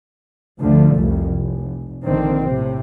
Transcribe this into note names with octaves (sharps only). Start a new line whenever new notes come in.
D2 D3 F3 A3
F1 C2 F2
F1
A#1 D3 D#3 C4
A2 C3